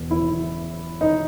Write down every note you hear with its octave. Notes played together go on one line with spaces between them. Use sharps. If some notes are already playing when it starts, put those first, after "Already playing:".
Already playing: E1
E4
D#4